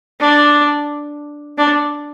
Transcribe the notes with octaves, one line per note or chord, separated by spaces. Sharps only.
D4
D4